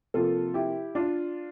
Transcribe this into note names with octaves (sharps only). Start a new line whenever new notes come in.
C3 F3 A#3 F4 A4
E4 G4
D4 F4